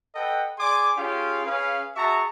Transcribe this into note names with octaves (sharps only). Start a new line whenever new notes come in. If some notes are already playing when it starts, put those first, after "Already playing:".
A4 B4 D#5 F#5 G5
G#4 D5 G#5 C6 D6
C#4 F4 G4 G#4 F5
C#4 G#4 B4 F5
F#4 G#4 E5 A5 A#5 C#6